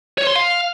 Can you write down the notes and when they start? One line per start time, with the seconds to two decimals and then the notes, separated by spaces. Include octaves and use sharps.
0.18 C#5
0.27 C6
0.36 F5